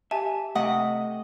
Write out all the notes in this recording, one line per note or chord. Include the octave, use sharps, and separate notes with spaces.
G4 E5 G#5 A5
C3 A3 D#5 F#5